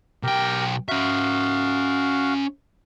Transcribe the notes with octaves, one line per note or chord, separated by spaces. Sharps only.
B1 G4 A#4 G5
C#4 F#4 E5 F5